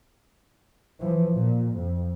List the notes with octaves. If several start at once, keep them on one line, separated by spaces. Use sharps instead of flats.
E3 F3
A#2
F2